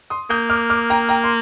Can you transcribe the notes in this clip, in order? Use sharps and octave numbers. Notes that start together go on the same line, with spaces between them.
C6 D#6
A#3 D#6 G6
D6 F6
D6 F6
G5 A#5
G5 A#5
C6